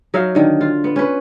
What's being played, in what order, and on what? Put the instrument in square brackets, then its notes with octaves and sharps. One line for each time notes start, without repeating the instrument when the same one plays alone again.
[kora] F#3 D#4 E5 F5
D3 D#3
F4
B3
C#4 B4